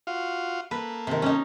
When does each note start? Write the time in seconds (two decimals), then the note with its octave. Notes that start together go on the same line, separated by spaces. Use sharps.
0.07 F4 F#4 F5
0.71 A#3 A4 B4
1.07 C3 D#3
1.22 C#4 D#4